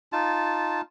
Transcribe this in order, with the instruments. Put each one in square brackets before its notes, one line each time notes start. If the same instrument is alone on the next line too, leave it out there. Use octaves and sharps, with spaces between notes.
[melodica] D#4 F4 A5